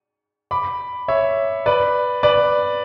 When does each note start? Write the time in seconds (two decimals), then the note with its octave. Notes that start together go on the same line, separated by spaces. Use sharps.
0.51 B5 D6
1.08 C#5 E5
1.66 B4 D5
2.23 B4 D5